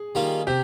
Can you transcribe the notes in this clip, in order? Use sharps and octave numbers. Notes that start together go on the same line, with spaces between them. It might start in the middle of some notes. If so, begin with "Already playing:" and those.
Already playing: G#4
D#3 G3 A#3 F4
C3 G4